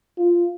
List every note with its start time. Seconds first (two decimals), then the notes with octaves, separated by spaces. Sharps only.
0.18 F4